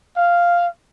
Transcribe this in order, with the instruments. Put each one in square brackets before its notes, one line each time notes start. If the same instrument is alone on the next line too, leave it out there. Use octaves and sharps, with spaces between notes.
[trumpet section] F5